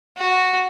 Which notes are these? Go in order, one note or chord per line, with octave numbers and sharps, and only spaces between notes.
F#4